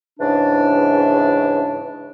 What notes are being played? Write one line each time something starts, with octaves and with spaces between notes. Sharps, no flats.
G#2 C#3 E3 D4